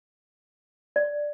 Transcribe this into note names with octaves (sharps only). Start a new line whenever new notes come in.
D5